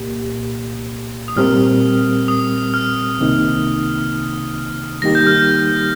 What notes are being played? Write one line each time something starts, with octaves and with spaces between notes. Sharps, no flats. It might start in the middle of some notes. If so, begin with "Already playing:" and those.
Already playing: C2 A#2 A#3 G4
D#6
A#2 G3 C4 G4 A#4 F6
D#6
F6
C2 C3 D#3 A#3 D#4
D#3 G3 A#3 D#4 G4 A#6
G6
F6
G6